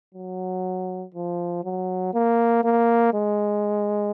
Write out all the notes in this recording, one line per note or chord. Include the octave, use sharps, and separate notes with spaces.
F#3
F3
F#3
A#3
A#3
G#3